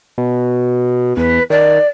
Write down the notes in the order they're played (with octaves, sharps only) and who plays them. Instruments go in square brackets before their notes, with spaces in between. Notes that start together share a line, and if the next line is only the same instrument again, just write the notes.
[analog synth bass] B2
[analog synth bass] E2 [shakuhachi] B4
[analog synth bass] D#3 [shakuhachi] D5